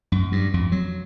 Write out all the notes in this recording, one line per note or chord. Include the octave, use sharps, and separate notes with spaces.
F#2
G2
F2
F#3